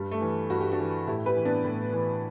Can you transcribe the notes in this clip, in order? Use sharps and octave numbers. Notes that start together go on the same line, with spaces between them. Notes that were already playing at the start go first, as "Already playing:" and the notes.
Already playing: G2 G3
A3
E3
G2 F#4
G4
D4 F#4
E3
A2 E4 G4
G4 B4
E3
B3 D4
A2
E3